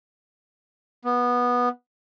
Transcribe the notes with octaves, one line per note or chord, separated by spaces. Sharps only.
B3